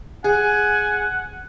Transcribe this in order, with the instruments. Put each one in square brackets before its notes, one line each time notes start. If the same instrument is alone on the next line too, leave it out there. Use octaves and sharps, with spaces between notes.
[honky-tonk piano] G#4 [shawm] F#5 [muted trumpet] G#5